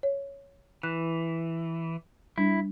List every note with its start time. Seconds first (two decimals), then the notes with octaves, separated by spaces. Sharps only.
0.03 C#5
0.83 E3 F#6
2.38 G3 D4 E4